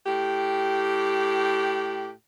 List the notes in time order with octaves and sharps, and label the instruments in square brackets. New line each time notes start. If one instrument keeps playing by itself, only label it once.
[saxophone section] A2 G4